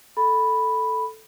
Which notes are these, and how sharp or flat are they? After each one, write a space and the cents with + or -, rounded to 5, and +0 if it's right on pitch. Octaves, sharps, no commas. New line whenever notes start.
A4 +0 B5 +0